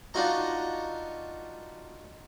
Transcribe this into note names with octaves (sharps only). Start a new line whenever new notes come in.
D4 D#4 F4 F#4 D#5 A#5